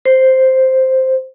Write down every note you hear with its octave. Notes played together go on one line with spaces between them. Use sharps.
C5